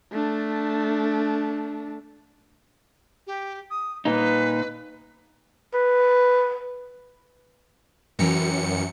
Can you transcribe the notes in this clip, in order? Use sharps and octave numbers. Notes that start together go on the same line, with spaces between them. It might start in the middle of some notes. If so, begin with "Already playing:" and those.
A3 D4
G4
D#6
A#2 D#4 B4
B4
F#2 E3 G5 A#5 C#7